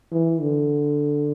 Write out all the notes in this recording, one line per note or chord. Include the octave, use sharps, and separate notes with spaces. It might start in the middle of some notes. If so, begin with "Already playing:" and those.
E3
D3